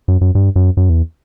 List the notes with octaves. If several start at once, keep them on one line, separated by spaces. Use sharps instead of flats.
F#2
F#2
G2
F#2
F#2
E2